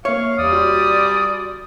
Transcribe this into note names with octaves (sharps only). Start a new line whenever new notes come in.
A#3 C#5 E5 F5
E2 G3 D5 D#6
F#4 C6